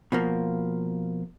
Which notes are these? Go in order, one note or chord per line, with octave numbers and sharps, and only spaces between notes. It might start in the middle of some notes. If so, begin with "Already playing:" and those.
B2 F3 A#3